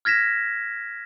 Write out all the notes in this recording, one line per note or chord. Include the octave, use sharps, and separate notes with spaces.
F6 G#6 A#6 B6 E7